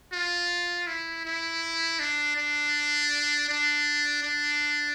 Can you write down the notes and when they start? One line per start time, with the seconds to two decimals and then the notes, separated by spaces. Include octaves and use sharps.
0.13 F4
0.87 E4
1.25 E4
2.00 D4
2.37 D4
3.49 D4
4.23 D4